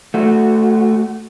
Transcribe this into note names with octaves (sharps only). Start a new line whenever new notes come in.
A3 F#4